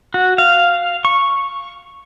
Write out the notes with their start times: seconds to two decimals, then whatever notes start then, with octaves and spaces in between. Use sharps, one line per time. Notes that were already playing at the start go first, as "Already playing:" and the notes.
0.14 F#4
0.38 F5
1.05 C#6